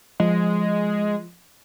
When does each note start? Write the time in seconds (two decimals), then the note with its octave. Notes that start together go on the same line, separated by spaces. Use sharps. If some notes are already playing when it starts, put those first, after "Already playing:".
0.20 F3 G#3